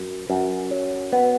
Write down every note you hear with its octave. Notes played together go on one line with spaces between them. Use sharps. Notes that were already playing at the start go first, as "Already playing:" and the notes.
Already playing: F#2
F#2
F#3
B3